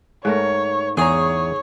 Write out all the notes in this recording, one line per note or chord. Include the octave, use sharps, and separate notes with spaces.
G#2 A3 A#4 C#5
E2 G#4 C#5 A#5